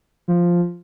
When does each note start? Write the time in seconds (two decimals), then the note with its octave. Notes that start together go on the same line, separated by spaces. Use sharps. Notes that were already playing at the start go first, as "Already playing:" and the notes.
0.28 F3